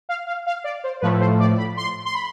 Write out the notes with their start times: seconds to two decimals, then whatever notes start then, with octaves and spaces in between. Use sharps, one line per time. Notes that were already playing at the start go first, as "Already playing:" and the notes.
0.09 F5
0.27 F5
0.46 F5
0.64 D5
0.84 C5
1.01 A2 F3 A3 B4
1.20 C5
1.40 D5
1.57 B5
1.77 C6
2.05 C6
2.14 B5